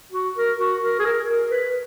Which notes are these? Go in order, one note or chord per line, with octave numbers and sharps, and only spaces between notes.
F#4
A#4
F#4
A#4
G#4
A#4
A#4
B4